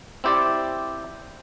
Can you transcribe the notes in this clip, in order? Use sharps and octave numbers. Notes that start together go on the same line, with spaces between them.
C4 E4 G4 C5 D5